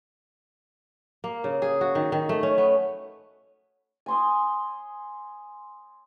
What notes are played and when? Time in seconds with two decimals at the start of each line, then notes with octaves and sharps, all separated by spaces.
1.24 A#3
1.44 C#3
1.62 G#4
1.81 F#4
1.95 D#3
2.12 D#3
2.29 A3
2.43 C#4
2.58 B3
4.06 G#5 C6 D#6